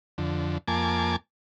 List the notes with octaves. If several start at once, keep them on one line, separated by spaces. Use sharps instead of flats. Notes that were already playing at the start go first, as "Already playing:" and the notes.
F2 D3
F2 A#3 G#5 A5 D6